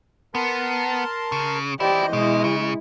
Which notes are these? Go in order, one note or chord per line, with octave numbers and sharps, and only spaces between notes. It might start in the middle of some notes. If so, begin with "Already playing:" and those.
B3 A#4 A5 C6
C#3
E3 E4 G4 C5 D5 D#5
B2 G#3 E4
C#3